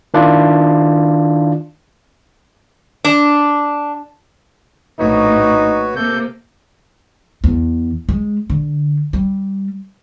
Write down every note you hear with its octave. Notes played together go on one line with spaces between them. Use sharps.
D#3 D4 E4 F4
D4
A#1 A2 D#4 F#4 B4 C#5
C3 A#3 A4 G6
E2
G#3
D3
G3